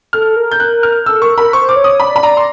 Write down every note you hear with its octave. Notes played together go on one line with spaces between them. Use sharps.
A4 F6
A#4
G6
F#6
F6
A4 E6
A#4 C#6
A#4 B5
C5 C#6
D6
C#5
D#6
D5 B5
B5
D5 A#5
C6